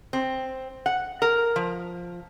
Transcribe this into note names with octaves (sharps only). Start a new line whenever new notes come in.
C4
F#5
A#4
F3